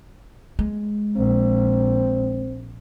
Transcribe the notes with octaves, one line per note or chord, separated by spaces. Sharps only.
G#3
A#1 C4